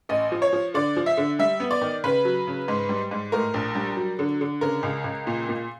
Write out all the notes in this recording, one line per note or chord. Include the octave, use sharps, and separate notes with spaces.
A1 D#5
F3
C#5
F3
D3 D5
F3
E5
D3
G3 E5
B3
D5
D#3
C#3 B4
F#3
C#3
G#2
G3
G#2
A2 A#4
A#1
G3
F#3
D3
D3
C#3 A#4
C#2
C#2
A#2
A#2